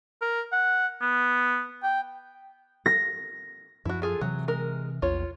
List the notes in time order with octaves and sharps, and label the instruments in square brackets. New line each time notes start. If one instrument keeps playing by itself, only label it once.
[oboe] A#4
F#5
B3
G5
[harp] A#6
[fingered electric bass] F#2 F3 [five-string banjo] E4 F#4
[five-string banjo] F4 G#4 A4
[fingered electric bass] C3 E3 [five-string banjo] F#3
[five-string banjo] G#3 A#4
[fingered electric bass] A#1 E2 [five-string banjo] F4 C#5